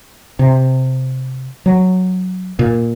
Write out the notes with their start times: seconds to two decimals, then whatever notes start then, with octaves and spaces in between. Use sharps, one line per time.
0.39 C3
1.66 F#3
2.59 A#2